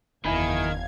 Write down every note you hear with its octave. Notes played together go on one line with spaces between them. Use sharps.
F#1 E2 D#3 E4 F5 G#5 B5 G#6